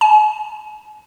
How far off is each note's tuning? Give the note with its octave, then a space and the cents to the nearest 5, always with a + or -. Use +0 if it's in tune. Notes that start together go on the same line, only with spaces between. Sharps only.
G#5 +45